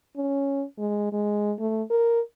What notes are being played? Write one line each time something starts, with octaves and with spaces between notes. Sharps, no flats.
C#4
G#3
G#3
A3
A#4